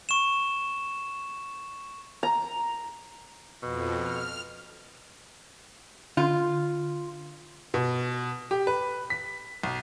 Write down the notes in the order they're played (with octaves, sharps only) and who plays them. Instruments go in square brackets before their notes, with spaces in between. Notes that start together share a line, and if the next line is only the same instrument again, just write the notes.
[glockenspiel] C#6 E7
[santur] A#5
[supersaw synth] F2 [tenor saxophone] B2
[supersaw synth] F6
[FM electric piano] D3 [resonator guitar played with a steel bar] F4
[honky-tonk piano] B2
G4
B4
B6
B1